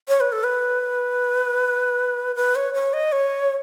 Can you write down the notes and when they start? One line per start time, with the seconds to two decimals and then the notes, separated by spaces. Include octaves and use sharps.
0.08 C#5
0.20 B4
0.32 A4
0.44 B4
2.36 B4
2.56 C#5
2.74 C#5
2.93 D#5
3.12 C#5